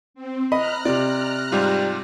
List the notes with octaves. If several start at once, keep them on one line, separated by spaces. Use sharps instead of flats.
C4
D#5 A#5 B5 F6 F#6
C3 D5
G#2 G3 F4